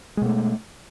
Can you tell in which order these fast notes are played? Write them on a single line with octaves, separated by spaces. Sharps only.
G#3 B2 A3